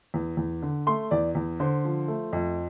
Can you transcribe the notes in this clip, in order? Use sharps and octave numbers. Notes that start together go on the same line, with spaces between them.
E2
E2
D3
A3 C6
E2 D5
E2
D3 C5
F3
A3
F2